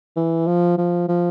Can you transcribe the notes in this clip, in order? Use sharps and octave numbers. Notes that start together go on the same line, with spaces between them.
E3
F3
F3
F3